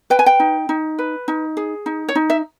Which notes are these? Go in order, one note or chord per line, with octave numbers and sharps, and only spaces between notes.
B4 G5
G#5
G5
D#4
D#4
B4
D#4
G#4
D#4
C#5
D#4
E5